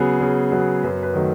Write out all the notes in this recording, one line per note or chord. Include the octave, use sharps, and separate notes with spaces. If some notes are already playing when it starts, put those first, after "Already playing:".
Already playing: C#3 F#3 B3 G#4
C#3
F#3 B3
F#2 B4
B4
D#3 F#3 A3